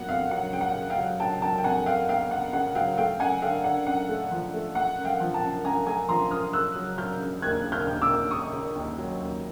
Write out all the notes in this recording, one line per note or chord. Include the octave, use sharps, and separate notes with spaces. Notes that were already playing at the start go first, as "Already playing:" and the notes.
Already playing: F#3 B3 F#5
F2 F5
F#3 F#5
C#3 G5
F#5
C#3
F5 G5
F#3
F#3 G5 A5
F#3 G5 A5
G5
F2 F#5 G#5
F2 F5 G5
B3 F5 G5
B3 F#5
C#3 F#5
F#3 F5 G5
A3 F5 G5
F#2 F#5 G#5
D3 F5 G5
D3 F#5
F#2 F#5
A3
F3
A3
A3 F#5
F#2
F5 G5
F3
G5 A5
F#2
F#2 G#5 A#5
A3 G#5 A#5
F3 A#5 C6
F#2 D#6 F6
C#3 E6 F#6
F#3
F#3 F6 G6
C#3
D#2 F#6 G#6
C#3
F6 G6
D#2
D6 E6
D#2
C#3 C#6 D#6
C#3
D#2
F#3
D#2